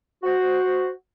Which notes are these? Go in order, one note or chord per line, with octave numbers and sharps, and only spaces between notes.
F#4 C5